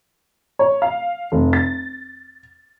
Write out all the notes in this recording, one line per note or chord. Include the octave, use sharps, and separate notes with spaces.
C#5
F5
F1
A6